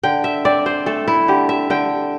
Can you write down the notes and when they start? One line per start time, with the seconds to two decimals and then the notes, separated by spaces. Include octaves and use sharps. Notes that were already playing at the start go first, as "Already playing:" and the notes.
0.03 D3 G5
0.24 E5
0.45 C4 D5
0.66 C5
0.86 A3 A4
1.08 E4
1.28 D3 G4
1.49 E5
1.70 D3 G5